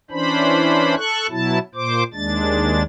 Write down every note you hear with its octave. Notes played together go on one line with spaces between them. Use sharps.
E3 C#4 D4 C5 B5
A4 C#6 F#6
B2 F#3 E4 A5
A#2 C5 D6
D#2 G#3 D4 A6